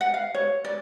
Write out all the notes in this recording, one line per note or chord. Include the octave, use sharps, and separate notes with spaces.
F#5
F5
C#5
D5